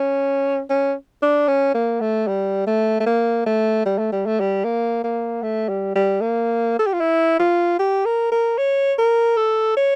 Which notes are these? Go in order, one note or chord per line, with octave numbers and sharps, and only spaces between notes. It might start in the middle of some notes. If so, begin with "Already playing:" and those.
Already playing: C#4
C#4
D4
C#4
A#3
A3
G3
A3
A3
A#3
A3
G3
A3
G3
A3
G3
A#3
A#3
A3
G3
G3
A#3
A4
G4
F4
E4
F4
G4
A#4
A#4
C#5
A#4
A4
C#5